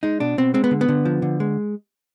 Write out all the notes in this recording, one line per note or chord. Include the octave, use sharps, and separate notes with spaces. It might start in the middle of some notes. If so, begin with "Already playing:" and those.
G#3 D#4
B2 D4
B2 C4
G#3 C4
B3
D3
B3
D3
F3
D3
G#3